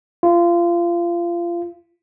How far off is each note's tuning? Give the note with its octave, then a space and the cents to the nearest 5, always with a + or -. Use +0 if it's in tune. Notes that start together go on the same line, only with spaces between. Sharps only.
F4 -25